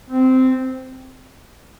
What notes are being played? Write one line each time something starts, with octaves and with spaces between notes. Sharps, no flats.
C4